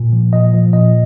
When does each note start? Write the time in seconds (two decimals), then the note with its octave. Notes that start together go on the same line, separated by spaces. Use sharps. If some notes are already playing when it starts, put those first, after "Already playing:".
Already playing: A#2
0.13 F3
0.33 A#2 D#5
0.53 F3
0.73 A#2 D#5